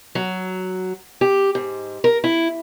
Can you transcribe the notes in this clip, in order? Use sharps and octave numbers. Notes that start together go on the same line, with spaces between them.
F#3
G4
G#2
A#4
E4